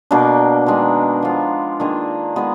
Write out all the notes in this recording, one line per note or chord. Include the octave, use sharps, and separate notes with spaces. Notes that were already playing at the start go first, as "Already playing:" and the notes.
B2 A#3 D4
D#3 G#3 D4
F3 B3 F4
D#3 A#3 D4 G#4
G#3 B3 D#4 G#4